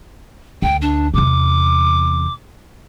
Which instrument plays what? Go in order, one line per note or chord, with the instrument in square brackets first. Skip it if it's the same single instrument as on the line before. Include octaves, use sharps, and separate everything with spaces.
[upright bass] D2 [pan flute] G5
[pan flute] D4
[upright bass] E2 C3 [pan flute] D6